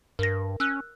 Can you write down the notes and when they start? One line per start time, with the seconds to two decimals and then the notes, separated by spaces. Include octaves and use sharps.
0.19 G2 A#4 A#6
0.60 C#4 E6 F#6